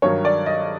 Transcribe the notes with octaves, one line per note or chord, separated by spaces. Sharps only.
G2 D#3 F#3 C#5
D5
D#5